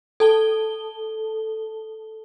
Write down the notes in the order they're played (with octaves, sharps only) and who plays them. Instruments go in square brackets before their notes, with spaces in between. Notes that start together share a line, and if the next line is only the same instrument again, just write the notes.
[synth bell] A4 A5 G7